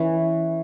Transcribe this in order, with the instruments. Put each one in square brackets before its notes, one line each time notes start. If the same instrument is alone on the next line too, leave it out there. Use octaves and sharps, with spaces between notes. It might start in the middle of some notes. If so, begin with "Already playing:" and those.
Already playing: [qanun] E3 C#4